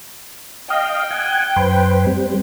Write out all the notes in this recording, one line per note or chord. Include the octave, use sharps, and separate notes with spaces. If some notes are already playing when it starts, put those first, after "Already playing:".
D#5 F5 G5
F#5 G#5
F#2 B4 C5
G3 C4